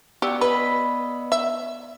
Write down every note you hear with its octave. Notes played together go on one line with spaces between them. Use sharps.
B3 F#4 G4 D5 G5 E6
B4 D#5 B5
E5